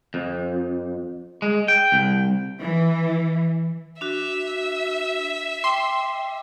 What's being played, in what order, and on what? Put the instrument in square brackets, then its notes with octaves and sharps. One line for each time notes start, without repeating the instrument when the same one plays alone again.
[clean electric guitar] F2
G#3
G5
C2
[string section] E3
[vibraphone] D4 F#4 [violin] E5
[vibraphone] G5 D6 [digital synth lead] C6